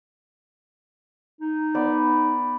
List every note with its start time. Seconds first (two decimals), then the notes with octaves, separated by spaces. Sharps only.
1.41 D#4
1.75 B3 D5